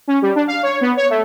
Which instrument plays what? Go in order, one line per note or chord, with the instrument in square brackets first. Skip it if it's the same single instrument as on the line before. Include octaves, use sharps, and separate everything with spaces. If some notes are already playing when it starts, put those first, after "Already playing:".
[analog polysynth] C#4
G3
D4
F5
C#5
B3
C#5
A3